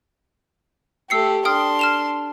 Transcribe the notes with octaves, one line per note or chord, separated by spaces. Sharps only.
A3 G4 E6 C7 C#7
D4 G5 C6 D#6 F6
F6 E7 F7